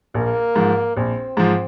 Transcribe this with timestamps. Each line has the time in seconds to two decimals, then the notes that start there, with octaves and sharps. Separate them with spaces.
0.15 A#1 A#3
0.56 G#2 F3
0.96 A#1 C4
1.37 G#2 F3